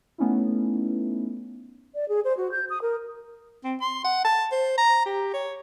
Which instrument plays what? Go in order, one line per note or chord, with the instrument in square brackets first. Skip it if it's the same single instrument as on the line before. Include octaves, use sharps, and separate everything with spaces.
[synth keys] A3 B3 C#4 D#4 E4
[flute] D5
G#4
C5
F#4
G6
D#6
A#4
[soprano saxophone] C4
C6
F#5
A5
C5
A#5
G4
C#5